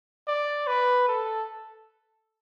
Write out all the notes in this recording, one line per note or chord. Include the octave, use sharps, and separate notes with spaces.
D5
B4
A4